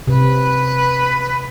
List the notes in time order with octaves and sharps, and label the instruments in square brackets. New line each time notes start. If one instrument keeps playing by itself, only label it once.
[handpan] C3 [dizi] B4